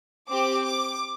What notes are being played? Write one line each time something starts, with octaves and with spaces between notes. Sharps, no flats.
C4 G4 D6
D6